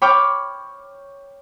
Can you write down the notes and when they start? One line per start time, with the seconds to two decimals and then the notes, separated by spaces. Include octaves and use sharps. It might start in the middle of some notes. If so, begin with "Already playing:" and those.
0.02 C#5 G5 B5 D6 F6